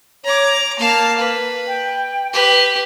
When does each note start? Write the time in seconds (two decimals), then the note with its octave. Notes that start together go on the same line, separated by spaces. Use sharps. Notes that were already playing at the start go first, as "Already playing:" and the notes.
0.25 C#5 A#5 D6
0.79 A#3 F5 A5
1.18 B4
1.68 G5
2.33 G4 B4